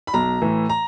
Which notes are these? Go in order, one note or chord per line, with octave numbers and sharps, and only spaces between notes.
B5
B1 A#5
A2 E3
A#5